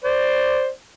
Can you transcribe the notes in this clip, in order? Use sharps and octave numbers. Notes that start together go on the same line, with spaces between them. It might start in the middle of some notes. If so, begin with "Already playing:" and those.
C5 D5